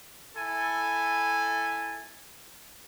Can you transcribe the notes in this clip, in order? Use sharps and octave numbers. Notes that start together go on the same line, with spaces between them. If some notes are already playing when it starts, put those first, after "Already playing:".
E4 A4 G#5 B5